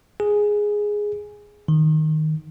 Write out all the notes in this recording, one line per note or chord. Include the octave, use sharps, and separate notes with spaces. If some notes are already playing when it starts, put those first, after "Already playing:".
G#4
D#3